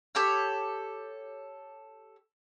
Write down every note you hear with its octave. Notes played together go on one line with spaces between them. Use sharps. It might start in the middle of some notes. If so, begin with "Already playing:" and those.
G4 A4 C#5 E6